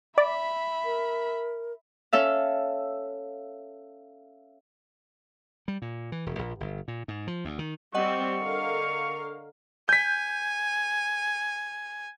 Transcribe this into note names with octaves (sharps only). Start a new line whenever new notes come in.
D5 E5 B5
A#4
C#4 A4 E5 F5
G3
A#2
E3
E1
A#1
G1
A#2
G#2
F3
D2
D#3
G3 C4 D#5 F#5 C#6
D3 A#4 F5
G#5 G6 B6